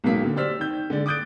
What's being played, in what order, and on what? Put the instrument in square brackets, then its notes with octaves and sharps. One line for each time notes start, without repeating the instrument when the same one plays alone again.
[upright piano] B1 G#2 F#3 A#3 B6
A#2 D3
G4 C5 D5 E6 F6 B6
D#3 G6
D3 G#3 D5
D6 D#6 F#6 G6 A6 D7